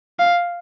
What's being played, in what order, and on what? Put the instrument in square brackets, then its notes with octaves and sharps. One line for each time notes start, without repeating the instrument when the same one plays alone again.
[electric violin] F5